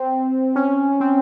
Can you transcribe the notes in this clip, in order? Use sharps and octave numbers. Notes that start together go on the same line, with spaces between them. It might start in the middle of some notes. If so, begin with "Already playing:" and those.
Already playing: C4
C#4
C4